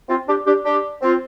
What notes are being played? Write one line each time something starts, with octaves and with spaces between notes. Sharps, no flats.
C4 F4
D4 G4
D4 G4
D4 G4
C4 F4